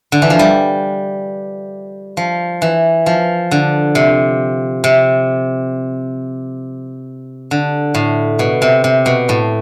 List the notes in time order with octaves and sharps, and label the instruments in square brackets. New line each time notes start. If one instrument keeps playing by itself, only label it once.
[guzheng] D3
E3
F3
G3
F3
E3
F3
D3
C3
C3
D3
A2
B2
C3
C3
B2
A2